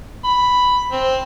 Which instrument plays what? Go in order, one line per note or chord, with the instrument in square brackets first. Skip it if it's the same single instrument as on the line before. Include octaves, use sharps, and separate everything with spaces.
[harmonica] B5
C4